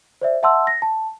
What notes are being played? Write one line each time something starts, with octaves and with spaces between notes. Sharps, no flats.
C5 D5 E5
E5 F#5 A5 C6 E6
A#6
A5